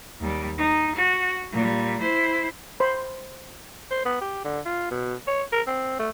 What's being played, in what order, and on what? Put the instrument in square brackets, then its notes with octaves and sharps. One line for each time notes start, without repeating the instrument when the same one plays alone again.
[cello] D#2 G3
D#4
F#4
A#2 G3
E4 C5
[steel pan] C5 B5
[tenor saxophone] C5
B3
G4
D3
F4
B2
C#5
A#4
C4
A3